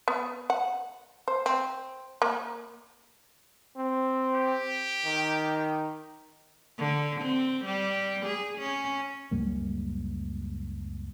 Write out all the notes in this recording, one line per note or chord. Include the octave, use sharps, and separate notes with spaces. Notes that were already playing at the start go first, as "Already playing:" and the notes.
B3
F#5
C5
C4
A#3
C4
G4
D#3
D3
C4
G3
G#4
C#4
C#2 F#2 G3 A#3